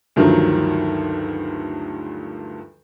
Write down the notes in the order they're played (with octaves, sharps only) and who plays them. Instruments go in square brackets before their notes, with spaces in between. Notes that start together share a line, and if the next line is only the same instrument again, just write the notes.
[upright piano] D2 G2 D#3 F3 F#3